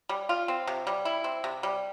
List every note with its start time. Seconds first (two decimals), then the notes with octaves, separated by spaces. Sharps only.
0.09 G3
0.29 F4
0.48 C4
0.67 C3
0.87 G3
1.05 E4
1.24 C4
1.44 C3
1.63 G3